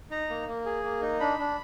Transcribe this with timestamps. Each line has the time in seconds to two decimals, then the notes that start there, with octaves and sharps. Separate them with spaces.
0.10 D#4 A#5
0.30 A#3
0.47 A#3
0.66 G#4
0.83 A#3
1.02 D#4
1.20 D4 B5
1.38 D4